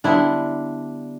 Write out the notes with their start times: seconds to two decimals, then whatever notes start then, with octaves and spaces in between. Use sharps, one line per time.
0.04 D3 G3 B3 D4 E4